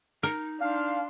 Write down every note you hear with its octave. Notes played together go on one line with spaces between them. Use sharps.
D#4 A#4
D4 F5 C6